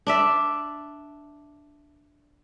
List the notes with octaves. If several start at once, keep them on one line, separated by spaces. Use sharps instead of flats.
D4 D5 E5